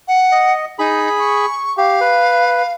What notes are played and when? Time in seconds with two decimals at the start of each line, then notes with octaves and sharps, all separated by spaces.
0.08 F#5
0.32 D#5
0.79 D#4 G#4 B5
1.19 C#6
1.78 G4 F5
2.01 B4